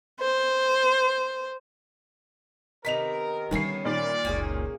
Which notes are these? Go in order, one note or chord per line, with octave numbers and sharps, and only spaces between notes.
C5
C3 D#3 B3 A#4 B6 F7
D3 D#3 G3 B3 C#4 E4 C7
A#2 D#3 D5
F#1 C#2 A#3 C#4 G#4